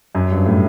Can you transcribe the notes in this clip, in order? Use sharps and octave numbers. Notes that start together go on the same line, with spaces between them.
F#2
G2
A2